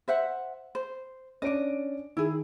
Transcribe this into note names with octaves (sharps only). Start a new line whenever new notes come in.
C5 E5 F#5
C5
C#4 D4 D5 D#5 D7
D#3 E4 G#4